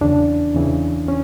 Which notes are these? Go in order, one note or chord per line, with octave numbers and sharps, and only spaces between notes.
E2 C#3 E3 D4
E2 C#3 E3
C#4